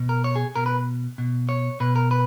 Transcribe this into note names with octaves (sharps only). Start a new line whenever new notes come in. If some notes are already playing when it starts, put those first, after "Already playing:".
Already playing: B2
A#4
C#5
G#4
B2 A#4
B4
B2
C#5
B2 B4
A#4
B4